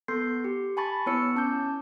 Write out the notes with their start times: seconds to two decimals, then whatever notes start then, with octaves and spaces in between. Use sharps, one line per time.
0.08 B3 A4 C6 G6 C7
0.44 G4
0.77 G#5 A5 B5 C#6 A6
1.06 B3 E4 C#5 E6 C#7
1.36 C#4 A5 D6 G6